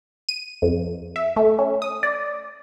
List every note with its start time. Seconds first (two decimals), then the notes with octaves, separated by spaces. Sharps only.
0.29 D#7
0.62 F2
1.16 E5
1.36 A3
1.59 C#4
1.82 D#6
2.03 D5